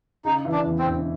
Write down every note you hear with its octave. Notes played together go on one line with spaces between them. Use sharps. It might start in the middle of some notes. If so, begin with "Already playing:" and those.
C#3 D#4
E3
D4
E2
C4
E1